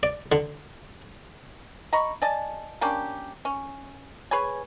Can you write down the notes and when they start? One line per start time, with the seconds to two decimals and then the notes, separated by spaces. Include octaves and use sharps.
0.03 D5
0.32 D3
1.93 D#5 A#5 B5 C#6
2.22 D5 D#5 G#5 A5
2.81 A#3 C#4 D4 G4
3.45 C#4
4.31 G#4 B4 C#5 G#5